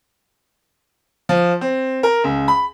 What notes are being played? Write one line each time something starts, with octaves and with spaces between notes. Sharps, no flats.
F3
C4
A#4
C#2
B5